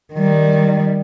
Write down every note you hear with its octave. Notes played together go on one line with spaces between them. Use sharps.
D#3 G3